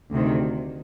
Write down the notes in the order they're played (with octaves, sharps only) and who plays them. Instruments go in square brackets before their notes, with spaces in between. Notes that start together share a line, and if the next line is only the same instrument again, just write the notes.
[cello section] D2 C3 D#3